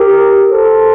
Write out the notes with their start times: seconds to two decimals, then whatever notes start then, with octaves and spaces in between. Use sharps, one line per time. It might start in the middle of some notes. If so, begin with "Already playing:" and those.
Already playing: G4 A#4
0.50 A4 C5